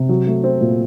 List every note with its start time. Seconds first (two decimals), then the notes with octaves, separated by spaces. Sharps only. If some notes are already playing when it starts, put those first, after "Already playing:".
Already playing: C3
0.09 F#3
0.26 A3
0.44 C4
0.61 A#2